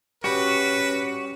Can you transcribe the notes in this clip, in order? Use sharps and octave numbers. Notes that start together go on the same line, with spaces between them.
G3 C#4 F#4 B4